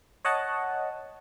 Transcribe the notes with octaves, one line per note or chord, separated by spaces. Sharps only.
C#5 D#5 F#5 A5